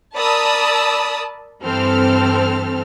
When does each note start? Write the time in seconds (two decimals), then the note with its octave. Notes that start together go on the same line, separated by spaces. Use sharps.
0.16 A#4 D5 A5 B5 D#6 E6
1.63 G2 E3 C4 A4 F6